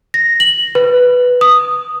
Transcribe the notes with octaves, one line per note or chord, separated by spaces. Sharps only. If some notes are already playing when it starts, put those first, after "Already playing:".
A#6
F#7
B4
D#6